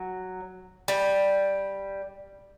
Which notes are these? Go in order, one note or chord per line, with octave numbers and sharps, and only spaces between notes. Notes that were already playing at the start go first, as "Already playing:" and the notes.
Already playing: F#3
G3